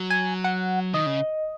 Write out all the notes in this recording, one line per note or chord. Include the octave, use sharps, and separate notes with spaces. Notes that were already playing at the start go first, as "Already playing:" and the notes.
Already playing: F#3
G#5
F#5
D#3 D#5
C#3